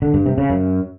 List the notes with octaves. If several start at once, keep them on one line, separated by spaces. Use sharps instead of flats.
D3
G2
C3
C#3
F#2